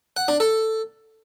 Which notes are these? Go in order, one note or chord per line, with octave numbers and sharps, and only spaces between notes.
F#5
D4
A4